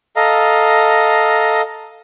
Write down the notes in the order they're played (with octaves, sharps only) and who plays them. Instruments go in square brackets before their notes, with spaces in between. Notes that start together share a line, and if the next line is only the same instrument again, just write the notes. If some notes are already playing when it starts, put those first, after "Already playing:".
[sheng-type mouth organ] A4 D#5 F5 A#5